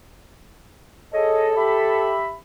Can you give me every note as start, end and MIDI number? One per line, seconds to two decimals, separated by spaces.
1.14 1.51 68
1.14 2.13 69
1.14 1.51 73
1.14 1.51 75
1.57 2.36 67
1.57 2.36 76
1.57 2.36 83